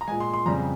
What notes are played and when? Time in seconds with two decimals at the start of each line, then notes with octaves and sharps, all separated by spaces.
0.01 A#5
0.08 A#2 G#3 G#5
0.20 C6
0.34 C6
0.45 F2 C#3 G3 A#5